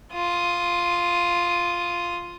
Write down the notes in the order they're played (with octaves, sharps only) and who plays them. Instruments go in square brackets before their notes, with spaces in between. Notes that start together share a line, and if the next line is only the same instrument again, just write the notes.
[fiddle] F4 D#6